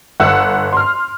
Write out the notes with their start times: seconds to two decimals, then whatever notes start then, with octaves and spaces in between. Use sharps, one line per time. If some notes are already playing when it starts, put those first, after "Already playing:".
0.20 G1 F#5 E6
0.73 C6 F6